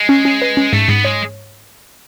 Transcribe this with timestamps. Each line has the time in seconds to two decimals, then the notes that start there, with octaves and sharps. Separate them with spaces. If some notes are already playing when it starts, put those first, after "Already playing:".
Already playing: G#3
0.09 C#4
0.25 C#4
0.42 B4
0.57 C#4
0.73 G#2 A3
0.88 G#2 B3
1.04 G#3 C#5